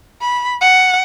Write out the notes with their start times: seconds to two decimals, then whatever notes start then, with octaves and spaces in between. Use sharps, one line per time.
0.21 B5
0.61 F#5